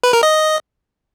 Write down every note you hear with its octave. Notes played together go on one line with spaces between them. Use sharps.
B4
A#4
D#5